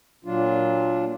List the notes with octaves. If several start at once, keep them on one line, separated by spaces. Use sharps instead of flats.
A#2 F#3 D4 F4